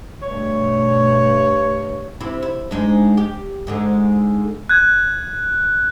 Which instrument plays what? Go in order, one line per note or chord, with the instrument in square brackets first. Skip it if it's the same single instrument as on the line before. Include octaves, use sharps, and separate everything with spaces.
[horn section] G2 C#5 [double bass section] B2 A3
[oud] C3 E4
E4
G#2 G#3 D4
G4
G#2 D3 G#3
[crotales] F#6 G#6